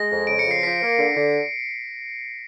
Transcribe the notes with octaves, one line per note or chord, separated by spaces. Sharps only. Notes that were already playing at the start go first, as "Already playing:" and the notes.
Already playing: G#3 A#6
F2
C#3 D7
C#7
F3
C7
F3 B6
A#3
D3
D3